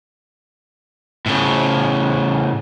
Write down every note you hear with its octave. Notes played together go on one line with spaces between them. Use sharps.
A2 C#3